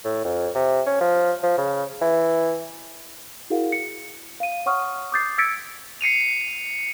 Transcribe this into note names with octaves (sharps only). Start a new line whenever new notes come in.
A2
F2
C3
C#4
F3
F3
C#3
E3
E4 F#4 G#4 A#4 F5 F#5
C#7
F5 D#7
C#5 F#5 C#6 D#6 F6
D6 D#6 G6 A6 C7
E6 G#6 A6 B6 C#7 D7
C7 C#7 D#7 F7